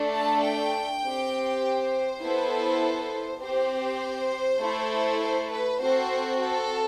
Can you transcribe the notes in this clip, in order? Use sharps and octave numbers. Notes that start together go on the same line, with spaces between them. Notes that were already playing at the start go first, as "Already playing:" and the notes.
Already playing: A3 D4 A4
A5
G5
C4 G4
C5
B3 E4 A4
C4 G4 C5
A3 E4 A4
C5
B4
C4 F#4 A4 C5
A4